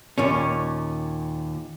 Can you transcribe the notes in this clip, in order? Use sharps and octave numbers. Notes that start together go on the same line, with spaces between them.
D#2 A#2 C#4